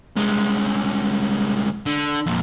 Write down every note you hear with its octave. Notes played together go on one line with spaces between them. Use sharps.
C2 G#3
D3
F2 A#2